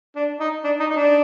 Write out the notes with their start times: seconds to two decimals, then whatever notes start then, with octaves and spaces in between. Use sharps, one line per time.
0.16 D4
0.40 D#4
0.64 D4
0.80 D#4
0.90 D#4
0.96 D4